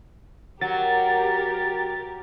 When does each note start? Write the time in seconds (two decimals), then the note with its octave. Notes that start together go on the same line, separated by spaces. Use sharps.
0.61 F#3 G4 A#4 A6